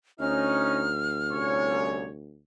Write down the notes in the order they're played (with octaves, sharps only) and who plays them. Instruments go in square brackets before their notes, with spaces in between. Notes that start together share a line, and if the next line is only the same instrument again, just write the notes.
[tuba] D2 [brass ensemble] C#4 D#4 [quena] F6
[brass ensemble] C2 C#4 C#5